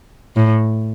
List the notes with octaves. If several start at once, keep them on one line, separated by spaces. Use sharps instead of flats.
A2